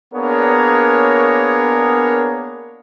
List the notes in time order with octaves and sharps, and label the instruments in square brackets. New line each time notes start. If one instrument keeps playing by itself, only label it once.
[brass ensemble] A#3 B3 D4 G#4 A#4 C#5